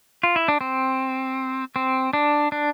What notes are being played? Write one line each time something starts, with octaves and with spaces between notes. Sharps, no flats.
F4
E4
D4
C4
C4
D4
D4